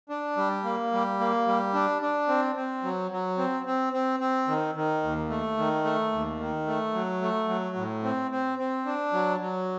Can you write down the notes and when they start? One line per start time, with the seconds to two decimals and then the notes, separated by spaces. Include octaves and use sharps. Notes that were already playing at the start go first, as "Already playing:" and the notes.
0.09 D4
0.37 G3
0.64 A#3
0.92 G3
1.20 A#3
1.47 G3
1.73 D4
2.02 D4
2.28 C4
2.55 C4
2.83 F#3
3.11 F#3
3.38 C4
3.66 C4
3.93 C4
4.20 C4
4.48 D#3
4.75 D#3
5.03 D#2
5.30 A3
5.57 D#3
5.84 A3
6.12 D#2
6.40 D#3
6.67 A3
6.94 F#3
7.22 A3
7.48 F#3
7.76 A2
8.03 C4
8.31 C4
8.59 C4
8.86 D4
9.13 F#3
9.40 F#3